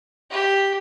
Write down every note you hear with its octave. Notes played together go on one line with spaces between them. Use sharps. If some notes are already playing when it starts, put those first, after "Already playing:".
G4